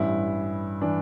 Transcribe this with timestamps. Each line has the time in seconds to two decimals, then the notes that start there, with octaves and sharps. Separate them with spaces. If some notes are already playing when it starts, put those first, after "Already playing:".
Already playing: A1 G2 E3 E4
0.81 E3 D4